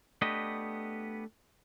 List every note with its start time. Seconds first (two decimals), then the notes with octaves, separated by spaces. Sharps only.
0.22 A3 B3 D4 G4 D#5